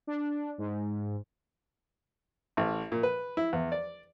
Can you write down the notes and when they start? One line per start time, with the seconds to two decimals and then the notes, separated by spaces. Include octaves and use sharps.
0.07 D4
0.58 G#2
2.57 A1
2.92 A#2
3.03 B4
3.37 E4
3.53 E2
3.72 D5